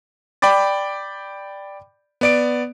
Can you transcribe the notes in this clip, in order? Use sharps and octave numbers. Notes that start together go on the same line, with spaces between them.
D5 G5 B5 D6 A6
B3 D5 D7